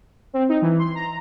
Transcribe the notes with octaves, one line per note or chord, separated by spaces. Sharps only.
C4
D#4
E3
C6
A#5